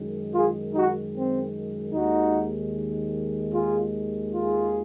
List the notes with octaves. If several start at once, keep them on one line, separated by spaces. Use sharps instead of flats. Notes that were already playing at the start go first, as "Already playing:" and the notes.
Already playing: F#2 D#3 G#3
F4 G#4
D#4 F#4
C4
D#2 D#3 G#3 D#4 F#4
F4 G#4
F4 G#4